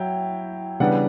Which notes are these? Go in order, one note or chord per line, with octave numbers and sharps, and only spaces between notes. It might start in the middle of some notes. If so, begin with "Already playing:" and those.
Already playing: F#3 E4 G5
C#3 E3 G3 B3 D4 F#5